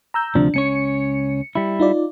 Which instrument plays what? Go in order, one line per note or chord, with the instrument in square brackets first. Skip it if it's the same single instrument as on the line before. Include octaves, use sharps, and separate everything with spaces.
[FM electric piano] A#5 E6 G6
[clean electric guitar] D2 C3 F3 [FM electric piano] D4
[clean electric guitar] C#2 C#4 C#5 [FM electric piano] C#7
[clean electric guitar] G3 E4
[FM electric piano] D#4 F4 D5